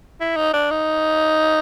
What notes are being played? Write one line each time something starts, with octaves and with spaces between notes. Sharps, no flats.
E4
D#4
D4
D#4